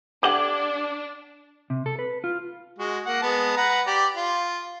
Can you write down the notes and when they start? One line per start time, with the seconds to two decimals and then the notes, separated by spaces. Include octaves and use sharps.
0.23 D4 G4 F5 F#5 D6 G#6 F#7
1.70 C3
1.86 A4
1.99 B4
2.24 F4
2.79 G#3 F#4
3.06 A#3 F#5
3.22 G#3 B3 A5
3.57 B4 F#5 A#5
3.87 G4 D5
4.16 F4